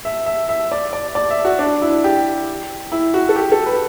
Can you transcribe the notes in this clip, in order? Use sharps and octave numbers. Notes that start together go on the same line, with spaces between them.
E5
E5
E5
D5
D5
D5
E5
F#4
D4
E4
G4
E4
F#4
A4
G4
A4
B4